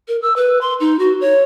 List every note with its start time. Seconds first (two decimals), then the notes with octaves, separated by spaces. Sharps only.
0.08 A#4
0.22 E6
0.36 B4
0.61 C6
0.80 D#4
0.99 F#4
1.21 C#5